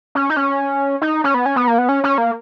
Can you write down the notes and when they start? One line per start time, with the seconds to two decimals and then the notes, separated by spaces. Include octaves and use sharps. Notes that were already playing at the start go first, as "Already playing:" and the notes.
0.15 C#4
0.30 D#4
0.37 C#4
1.02 D#4
1.24 C#4
1.34 B3
1.46 C#4
1.56 B3
1.68 A#3
1.78 B3
1.89 C#4
2.04 C#4
2.18 A#3